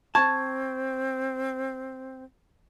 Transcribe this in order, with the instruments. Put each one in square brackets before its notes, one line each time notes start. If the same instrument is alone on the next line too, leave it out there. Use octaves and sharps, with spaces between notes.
[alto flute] C4 [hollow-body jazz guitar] A5 [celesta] C#6 G#6